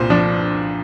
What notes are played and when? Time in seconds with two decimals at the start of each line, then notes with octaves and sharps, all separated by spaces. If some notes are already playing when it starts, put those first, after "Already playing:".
Already playing: C2 A#2 C5
0.10 F3 D4